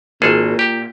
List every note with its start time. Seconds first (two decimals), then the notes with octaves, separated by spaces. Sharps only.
0.22 G#1 A#2 G#4 A4
0.59 G4